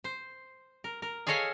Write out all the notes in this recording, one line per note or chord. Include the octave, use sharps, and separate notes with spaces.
C5
A#4
A#4
G#4 A4 C#5 D#5 F5 G#5